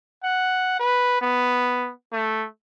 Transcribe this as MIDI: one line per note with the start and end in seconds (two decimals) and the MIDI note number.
0.24 0.75 78
0.79 1.19 71
1.21 1.91 59
2.12 2.46 57